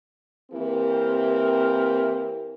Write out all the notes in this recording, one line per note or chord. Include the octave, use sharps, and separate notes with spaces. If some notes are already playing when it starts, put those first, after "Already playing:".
E3 A#3 C4 E4 G4 A#4